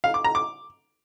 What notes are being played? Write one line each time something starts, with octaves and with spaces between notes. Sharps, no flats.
F5
D6
A#5
D6